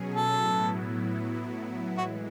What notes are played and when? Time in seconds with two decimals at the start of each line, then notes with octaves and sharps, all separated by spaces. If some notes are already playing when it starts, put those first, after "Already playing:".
Already playing: B2 F#3 C#4 G#4
0.14 A4
0.34 A2 F#3 B3 E4
1.97 E3 G#3 F#4